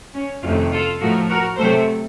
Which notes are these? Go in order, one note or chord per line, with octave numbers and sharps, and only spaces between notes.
C#4
F2 C3 D#3 A3 C#4 F4
F4 A4
A2 F3 A3 F#4 A#4
F#4 A#4
C3 F#3 A3 A4 C5